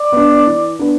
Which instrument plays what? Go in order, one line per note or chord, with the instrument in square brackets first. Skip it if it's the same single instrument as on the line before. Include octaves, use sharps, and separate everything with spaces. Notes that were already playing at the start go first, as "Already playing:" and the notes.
Already playing: [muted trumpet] D5
[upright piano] B3 D4
E3
B3 D4